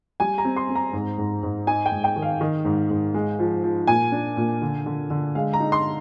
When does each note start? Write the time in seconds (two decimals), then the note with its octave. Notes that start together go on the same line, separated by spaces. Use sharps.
0.20 G3 G#5
0.38 A#5
0.45 C4
0.56 C6
0.69 C4
0.75 A#5
0.93 G#2
1.18 G#2
1.43 G#2
1.67 D#4 G#5
1.86 G5
1.92 G#2
2.04 G5
2.16 D#3
2.22 F5
2.41 D#3
2.65 G#2
2.90 G#2
3.14 G#3
3.39 F3
3.63 F3
3.87 A#2 G#5
4.12 D4
4.37 A#2
4.62 D3
4.86 D3
5.10 D3
5.35 G#3 F5
5.53 A#5
5.60 D#4
5.72 C6